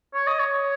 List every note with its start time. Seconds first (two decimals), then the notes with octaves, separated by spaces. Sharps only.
0.14 C#5
0.27 D#5
0.39 C#5